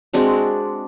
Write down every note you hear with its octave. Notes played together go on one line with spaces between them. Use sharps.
G#3 C4 D4 F#4